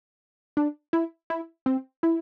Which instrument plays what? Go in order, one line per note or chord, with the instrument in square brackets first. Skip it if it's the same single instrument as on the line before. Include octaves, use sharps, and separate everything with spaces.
[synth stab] D4
E4
E4
C4
E4